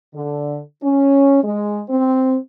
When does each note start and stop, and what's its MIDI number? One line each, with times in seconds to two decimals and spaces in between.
0.15 0.60 50
0.83 1.40 61
1.44 1.81 56
1.89 2.37 60